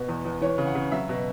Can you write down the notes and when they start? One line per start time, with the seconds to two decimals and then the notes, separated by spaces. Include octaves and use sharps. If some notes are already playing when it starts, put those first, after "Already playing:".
Already playing: B2 B3
0.08 E2
0.25 E2
0.41 E3 C#5
0.58 C#3
0.66 F#5
0.75 C#3
0.92 F#3 E5
1.09 B2